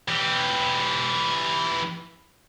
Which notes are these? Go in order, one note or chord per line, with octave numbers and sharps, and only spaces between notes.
E3 G4